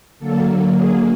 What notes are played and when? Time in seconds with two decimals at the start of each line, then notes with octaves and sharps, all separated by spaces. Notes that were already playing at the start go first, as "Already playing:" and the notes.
0.19 D3 F#3 A#3 A4
0.75 G#4